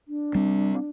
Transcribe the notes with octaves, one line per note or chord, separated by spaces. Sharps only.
D4
G3 C4